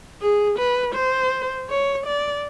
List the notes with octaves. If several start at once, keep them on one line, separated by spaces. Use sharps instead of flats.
G#4
B4
C5
C#5
D5